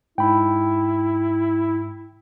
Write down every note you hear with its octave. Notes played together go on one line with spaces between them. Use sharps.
G#2 E4 G5 B5